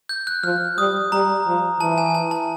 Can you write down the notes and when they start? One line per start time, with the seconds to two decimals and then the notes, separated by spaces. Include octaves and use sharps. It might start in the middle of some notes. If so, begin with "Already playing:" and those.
0.09 G6
0.27 F#6
0.43 F3 F6
0.78 G3 D#6
1.12 G3 A#5
1.47 F3
1.80 E3 A5
1.98 G#5
2.15 A5
2.31 A5